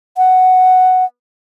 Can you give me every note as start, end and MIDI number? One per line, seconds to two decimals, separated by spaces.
0.17 1.05 78